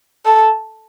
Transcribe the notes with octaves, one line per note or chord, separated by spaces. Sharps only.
A4